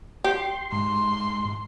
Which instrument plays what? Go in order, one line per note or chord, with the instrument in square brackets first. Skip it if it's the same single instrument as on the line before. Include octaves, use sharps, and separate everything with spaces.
[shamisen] G4 [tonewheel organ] C6
[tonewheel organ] G#2 [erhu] C6